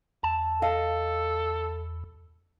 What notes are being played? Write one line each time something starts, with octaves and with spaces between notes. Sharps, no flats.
E2 A5
A4 D#5 F5